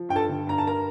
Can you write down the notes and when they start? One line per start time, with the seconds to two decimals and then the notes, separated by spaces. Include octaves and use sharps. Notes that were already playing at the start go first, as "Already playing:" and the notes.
Already playing: F3
0.09 G2 G5
0.16 A4 A5
0.28 D3
0.47 G2 A#5
0.58 A5
0.67 A#4 A#5